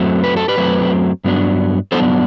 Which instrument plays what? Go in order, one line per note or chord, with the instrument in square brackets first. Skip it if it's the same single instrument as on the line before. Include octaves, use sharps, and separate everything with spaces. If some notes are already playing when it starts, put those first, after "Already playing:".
Already playing: [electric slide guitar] F#2 F#3 A3 C4
B4
A4
G4 B4
F#2 F#3 A3 C4
G2 F#3 B3 D4
G2 F#3 B3 D4 A4 C5